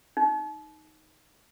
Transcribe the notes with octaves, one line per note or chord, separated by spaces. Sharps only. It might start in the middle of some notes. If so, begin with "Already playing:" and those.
D#4